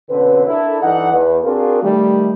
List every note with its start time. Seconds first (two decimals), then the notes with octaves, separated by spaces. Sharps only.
0.10 F2 B2 D3 C4 C#4 B4
0.47 D4 E4 A4 A#4
0.82 G2 E3 D#4 A4 D5 F#5
1.13 E2 B4
1.44 C4 D4 F4 F#4 G#4 A#4
1.83 D#3 G3 A3